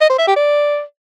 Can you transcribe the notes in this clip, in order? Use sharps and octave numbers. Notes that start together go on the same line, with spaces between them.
D#5
C5
E5
G4
D5